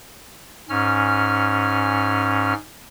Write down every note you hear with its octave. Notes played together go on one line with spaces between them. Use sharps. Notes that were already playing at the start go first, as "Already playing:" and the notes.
G#2 C#4 F6